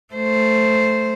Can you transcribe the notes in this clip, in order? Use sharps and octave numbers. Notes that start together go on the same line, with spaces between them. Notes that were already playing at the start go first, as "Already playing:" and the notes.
A3 C5